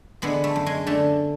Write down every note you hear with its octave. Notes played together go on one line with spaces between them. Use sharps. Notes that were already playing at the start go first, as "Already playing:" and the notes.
D3 G#3 B3
A3
F#2
G#3
D3 A3